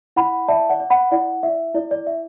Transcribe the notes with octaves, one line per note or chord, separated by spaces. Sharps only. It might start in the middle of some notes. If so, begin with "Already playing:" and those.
E4 F#5 B5
D5 E5 A5
D5 F#5
D5
F#5 B5
E4 D5 F#5
E4 E5
E4 D5
D5
D5 E5